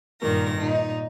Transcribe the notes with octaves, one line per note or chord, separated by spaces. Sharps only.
G2 A#2 D#3 A#4 A#6
A#2 D#4